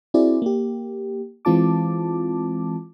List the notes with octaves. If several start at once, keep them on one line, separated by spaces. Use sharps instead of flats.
C4 E4 F#4 G#4 D5
A#3 G4
E3 G#3 C4 F4 A5 D6